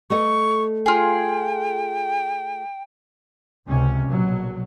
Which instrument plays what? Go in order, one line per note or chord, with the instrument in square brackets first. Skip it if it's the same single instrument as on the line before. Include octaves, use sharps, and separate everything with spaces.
[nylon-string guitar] A3 A4 D#5 [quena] C#6
[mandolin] F4 G#4 [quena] G5
[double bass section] C#2 C3 C#4
A#1 B2 F#3